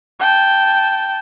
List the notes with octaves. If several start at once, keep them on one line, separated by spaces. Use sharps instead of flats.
G5 A5